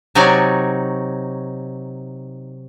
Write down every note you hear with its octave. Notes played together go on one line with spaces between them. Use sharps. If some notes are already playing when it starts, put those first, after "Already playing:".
C3 F#3 D#4 C#5 D5 G#5